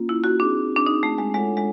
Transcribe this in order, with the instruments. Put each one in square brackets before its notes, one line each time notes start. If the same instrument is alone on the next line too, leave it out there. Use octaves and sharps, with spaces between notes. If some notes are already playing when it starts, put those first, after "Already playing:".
Already playing: [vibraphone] A#3 C#4 F4
[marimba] E4
F#4
[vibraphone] C4 D#4 G#4 [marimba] D4
[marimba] D4
D#4
A3
G#3
[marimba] G#3 [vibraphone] D4 F4 A4 C#5 F#5
[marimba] G#3